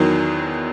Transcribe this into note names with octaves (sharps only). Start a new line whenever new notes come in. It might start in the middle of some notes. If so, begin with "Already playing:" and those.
Already playing: E2 D#3 F#3